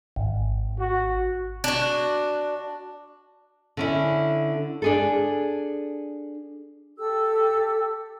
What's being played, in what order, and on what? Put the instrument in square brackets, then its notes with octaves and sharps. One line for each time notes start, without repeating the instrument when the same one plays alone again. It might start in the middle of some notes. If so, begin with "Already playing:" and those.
[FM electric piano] G#1
[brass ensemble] F#4
[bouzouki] D4 F#4
[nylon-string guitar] D3 C#4 E4
D4 G#4 A4
[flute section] G4 A4 E6